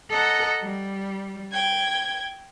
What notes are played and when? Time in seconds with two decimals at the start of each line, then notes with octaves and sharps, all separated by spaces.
0.10 A4 D#5 F#5 A#5
0.64 G3
1.52 G5 G#6